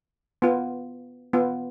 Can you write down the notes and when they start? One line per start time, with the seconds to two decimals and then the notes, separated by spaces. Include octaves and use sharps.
0.42 B3 F4
1.33 B3 F4